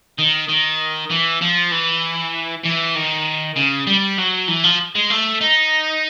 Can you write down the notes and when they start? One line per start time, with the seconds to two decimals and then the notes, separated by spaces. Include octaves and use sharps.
0.18 D#3
0.48 D#3
1.10 E3
1.41 F3
1.71 E3
2.64 E3
2.95 D#3
3.56 C#3
3.87 G3
4.18 F#3
4.48 E3
4.64 F3
4.95 G#3
5.10 A3
5.41 D#4